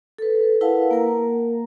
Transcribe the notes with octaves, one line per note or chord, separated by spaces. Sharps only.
A4 B4
E4 A#4 B4 F5 F#5 A5
A#3 A#4 A#5